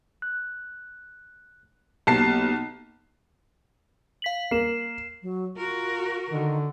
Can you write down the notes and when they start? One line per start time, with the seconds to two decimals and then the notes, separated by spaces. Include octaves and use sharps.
0.22 F#6
2.07 B1 A#3 B3 G4 A5 C7
4.22 F5 B6 F#7
4.51 A#3 C7 E7
5.22 F#3
5.57 F4 F#4 A#4
6.29 D3 D#3